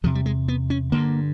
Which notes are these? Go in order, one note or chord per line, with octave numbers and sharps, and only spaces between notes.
E2 C3 F3
G3
G#3
B3
C#4
G2 D3 A#3